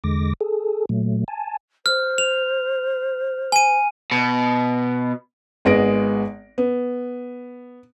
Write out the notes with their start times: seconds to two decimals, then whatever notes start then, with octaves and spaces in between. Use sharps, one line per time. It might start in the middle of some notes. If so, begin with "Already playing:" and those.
0.04 E2 D3 G#3 D6 A#6
0.41 G#4 A4
0.89 A#2 F#3 A3
1.28 G#5 A5
1.86 C5 F6
2.18 F7
3.52 G#5 D#7
4.12 B2
5.65 G#1 G#3 B3 A#6 D7
6.58 B3